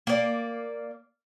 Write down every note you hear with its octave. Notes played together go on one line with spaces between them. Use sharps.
A#3 D5